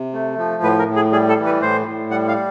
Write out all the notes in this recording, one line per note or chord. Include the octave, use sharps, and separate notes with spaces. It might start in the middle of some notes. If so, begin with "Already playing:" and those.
Already playing: C3
A3
F3
A2 B4
A#4
A2
G#4
G3 G#4
A4
E3
B4
A2 C5
A2
G3 F#5
F5